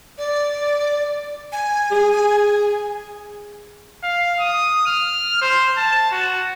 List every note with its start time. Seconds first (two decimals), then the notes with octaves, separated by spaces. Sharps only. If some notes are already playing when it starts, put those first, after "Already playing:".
0.18 D5
1.52 G#5
1.91 G#4
4.04 F5
4.40 D#6
4.87 F6
5.41 C5
5.78 A5
6.12 F#4